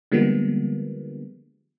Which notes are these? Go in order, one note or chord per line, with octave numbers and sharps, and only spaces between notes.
D3 F3 G3 G#3 A#3 B3